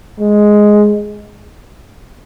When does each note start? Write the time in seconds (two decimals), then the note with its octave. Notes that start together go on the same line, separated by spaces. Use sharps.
0.20 G#3